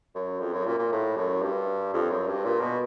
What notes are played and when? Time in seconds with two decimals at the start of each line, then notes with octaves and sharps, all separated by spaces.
0.15 F#2
0.40 F2
0.53 F#2
0.66 A#2
0.79 A#2
0.92 A2
1.17 F#2
1.42 G2
1.94 F2
2.10 F#2
2.27 G2
2.44 A#2
2.61 B2